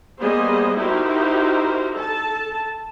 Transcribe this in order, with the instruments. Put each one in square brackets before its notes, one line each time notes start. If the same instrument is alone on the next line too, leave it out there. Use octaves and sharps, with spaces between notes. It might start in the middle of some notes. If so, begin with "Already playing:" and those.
[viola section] G3 A#3 B3 G#4 C5 D#5
D#4 E4 F#4 G4 A#4 C5
A4 A5